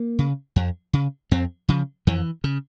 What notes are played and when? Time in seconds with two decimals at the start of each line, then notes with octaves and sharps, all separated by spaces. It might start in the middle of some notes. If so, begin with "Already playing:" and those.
Already playing: A#3
0.19 C#3
0.56 F2
0.93 C#3
1.31 F2 C4
1.69 C#3 F3
2.07 F2 E3
2.44 C#3